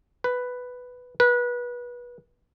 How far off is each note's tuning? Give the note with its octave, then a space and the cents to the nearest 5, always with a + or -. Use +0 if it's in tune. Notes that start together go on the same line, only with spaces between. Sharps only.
B4 +5
B4 -25